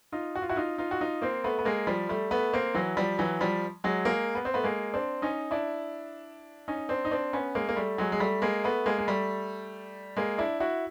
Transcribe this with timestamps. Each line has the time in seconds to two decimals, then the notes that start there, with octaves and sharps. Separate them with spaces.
0.12 D#4 F4
0.35 F#4
0.42 F4
0.49 E4 F#4
0.56 D#4 F4
0.78 D#4 F4
0.91 F#4
1.01 D#4 F4
1.22 A#3 C4
1.44 A3 B3
1.59 B3
1.65 G#3 A#3
1.87 F3 G3
2.09 G3 A3
2.31 A3 B3
2.53 A#3 C4
2.74 E3 F#3
2.97 F3 G3
3.19 E3 F#3
3.41 F3 G3
3.84 F#3 G#3
4.05 G#3 A#3
4.35 B3
4.45 C4
4.54 A3 B3
4.64 G#3 A#3
4.94 C4 D4
5.22 C#4 D#4
5.51 D4 E4
6.68 C#4 D#4
6.89 C4 D4
7.05 D#4
7.11 C4 D4
7.33 B3 C#4
7.55 G#3 A#3
7.69 A#3
7.77 G3 A3
7.98 F#3 G#3
8.12 G#3
8.20 G3 A3
8.42 G#3 A#3
8.64 A3 B3
8.86 G#3 A#3
8.98 G#3
9.08 G3 A3
10.17 G#3 A#3
10.38 D4 E4
10.60 E4 F#4